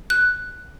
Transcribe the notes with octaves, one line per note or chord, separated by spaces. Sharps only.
F#6